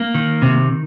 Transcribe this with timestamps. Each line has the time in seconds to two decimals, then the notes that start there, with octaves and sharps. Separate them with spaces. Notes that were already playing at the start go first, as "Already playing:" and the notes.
Already playing: A#3
0.14 D#3
0.42 C3